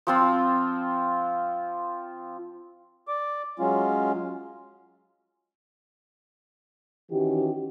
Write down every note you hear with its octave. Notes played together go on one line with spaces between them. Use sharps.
F3 C4 F4
D5 D6
F#3 G#3 C#4 F4
D#3 E3 C#4 F#4 G4